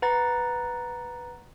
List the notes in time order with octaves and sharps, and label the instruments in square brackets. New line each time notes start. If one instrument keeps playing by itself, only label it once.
[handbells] B4 F#5 A#5 A6